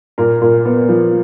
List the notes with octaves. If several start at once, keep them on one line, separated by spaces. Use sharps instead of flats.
A#2 A#4
A#2
B3
F3